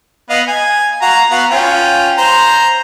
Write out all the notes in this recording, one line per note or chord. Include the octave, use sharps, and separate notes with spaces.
B3 D#5 F5
G#5
F#4 F5 A#5
B3 F#4 F5
C#4 F4 G5
C5 A#5